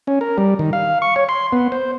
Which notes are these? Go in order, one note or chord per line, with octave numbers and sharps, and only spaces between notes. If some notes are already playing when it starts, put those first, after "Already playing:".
C#4
A#4
G3
D#3
F5
C#6
C#5
C6
B3
C5